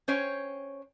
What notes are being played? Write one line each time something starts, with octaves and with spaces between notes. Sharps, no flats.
C#4 C5 C#5 G5